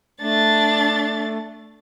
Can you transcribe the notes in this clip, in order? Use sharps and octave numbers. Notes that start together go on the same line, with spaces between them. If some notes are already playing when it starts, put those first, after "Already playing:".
A3 D4 A6